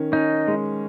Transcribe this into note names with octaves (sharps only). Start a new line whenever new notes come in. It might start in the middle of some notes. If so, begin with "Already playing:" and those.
Already playing: D#3 C#4
C#4 D#4
G#3